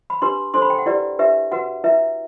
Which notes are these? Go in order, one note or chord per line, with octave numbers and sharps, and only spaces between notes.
B5
D4 G4 B4 C6
D4 A4 C5 C6
B5
G5
F#5
E4 G4 B4 D5
D4 G4 B4 E5
F#4 B4 F#5
E4 B4 E5